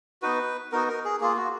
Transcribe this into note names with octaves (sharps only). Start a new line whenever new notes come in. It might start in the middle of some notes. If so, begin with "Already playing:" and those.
B3 D#4 F#4 B4
B3 D#4 F#4 A#4
A#4
G#4
A#3 F4 G#4
F#4